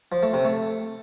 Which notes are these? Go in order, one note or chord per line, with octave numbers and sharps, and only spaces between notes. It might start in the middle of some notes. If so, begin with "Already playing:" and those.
F3
A3
C3
A3